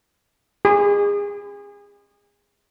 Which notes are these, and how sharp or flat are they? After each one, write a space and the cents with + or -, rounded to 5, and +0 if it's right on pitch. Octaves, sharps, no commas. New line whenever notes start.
G#4 -30